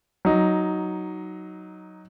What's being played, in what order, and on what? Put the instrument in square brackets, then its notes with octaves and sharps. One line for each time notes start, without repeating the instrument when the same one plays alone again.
[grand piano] F#3 D#4